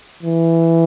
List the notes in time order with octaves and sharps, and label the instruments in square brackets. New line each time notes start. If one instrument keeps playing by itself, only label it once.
[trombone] E3